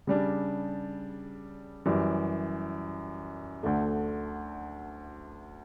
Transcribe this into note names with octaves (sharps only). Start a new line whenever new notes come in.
C#3 G3 D4
F#2 E3 G3
D2 D3 A3